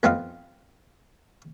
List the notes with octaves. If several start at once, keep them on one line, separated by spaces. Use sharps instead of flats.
F2 B3 C4 D#4 F4 F5